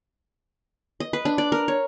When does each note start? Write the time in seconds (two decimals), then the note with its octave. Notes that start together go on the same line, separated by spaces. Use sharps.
1.00 D#5
1.13 B4
1.25 D4
1.38 D5
1.52 A#4
1.68 C#5